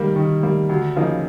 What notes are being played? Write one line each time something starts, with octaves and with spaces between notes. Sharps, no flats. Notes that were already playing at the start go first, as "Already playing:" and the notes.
Already playing: D#3 G3 A#3
D#3
G3 A#3
D2
C#3 F3 A#3 D#4